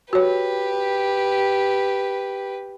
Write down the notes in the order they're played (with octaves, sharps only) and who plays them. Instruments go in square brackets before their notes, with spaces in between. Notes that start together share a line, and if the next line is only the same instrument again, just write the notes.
[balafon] F#4 C#5 [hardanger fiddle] G4 B4